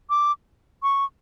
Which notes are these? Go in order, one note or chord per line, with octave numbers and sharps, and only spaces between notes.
D6
C#6